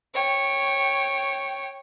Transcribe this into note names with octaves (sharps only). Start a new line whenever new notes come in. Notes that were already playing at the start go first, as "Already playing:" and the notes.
C#5 G5